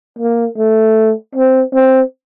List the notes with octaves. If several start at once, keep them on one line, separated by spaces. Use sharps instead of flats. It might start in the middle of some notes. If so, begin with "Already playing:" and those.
A#3
A3
C4
C4